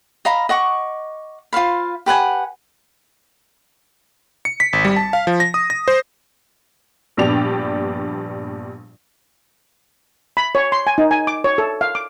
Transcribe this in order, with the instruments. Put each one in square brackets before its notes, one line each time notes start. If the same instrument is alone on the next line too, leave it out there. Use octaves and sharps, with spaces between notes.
[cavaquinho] D#5 F5 A#5 B5
D#5 F#5 C#6 D6
F4 C5 F5 B5
G4 B4 F#5 G#5
[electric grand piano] C#7
B6
G#1
G3
A5
F5
F3
A#6
D#6
A#6
C5
[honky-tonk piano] A#1 G2 B3 D4 G4 F7
[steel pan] B5
C#5
C6
G#5
D#4
G#5
D6
C#5
A4
F5
D6